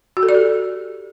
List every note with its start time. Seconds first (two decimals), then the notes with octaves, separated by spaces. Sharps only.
0.17 F#4
0.23 A4
0.29 D5
0.35 G4